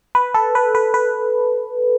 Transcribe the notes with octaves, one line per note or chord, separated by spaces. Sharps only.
B4
A4
B4
B4
B4